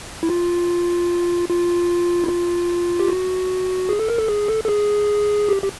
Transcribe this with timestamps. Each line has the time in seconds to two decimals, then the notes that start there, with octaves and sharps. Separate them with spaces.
0.23 E4
0.30 F4
1.50 F4
2.24 E4
2.29 F4
3.00 G4
3.08 F#4
3.89 G#4
4.00 A4
4.09 A#4
4.18 A4
4.28 G#4
4.48 A4
4.64 A4
4.68 G#4
5.49 G4
5.63 G4